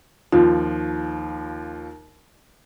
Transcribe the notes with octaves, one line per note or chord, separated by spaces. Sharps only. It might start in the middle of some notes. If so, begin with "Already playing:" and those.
D#2 F3 F4